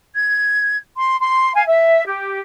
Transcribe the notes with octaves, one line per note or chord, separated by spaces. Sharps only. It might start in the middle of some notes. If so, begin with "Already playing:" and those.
G#6
C6
C6
F5 G#5
E5
G4